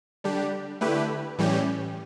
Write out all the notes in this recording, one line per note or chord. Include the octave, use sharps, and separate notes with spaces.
D3 G3 D4 G4
D3 A3 E4 G4 B4
A2 E3 G3 C#4 G4